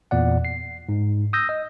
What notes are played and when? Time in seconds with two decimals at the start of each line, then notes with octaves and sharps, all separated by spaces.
0.11 E2 A#2 D5 F#5
0.45 C7
0.89 G#2
1.33 D#6 E6 G6 A#6
1.49 D#5